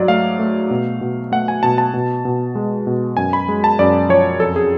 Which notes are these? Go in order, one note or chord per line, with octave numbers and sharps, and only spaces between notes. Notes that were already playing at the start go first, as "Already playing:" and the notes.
Already playing: G#2 F#3 D5
A3 F5
A3
B2
B2
A3 F#5
G#5
B2 A5
A5
B2
B2
G#3
B2
F#2 G#5
B5
G#3
A5
F#2 D5
F3 C#5
F2 A4
G#4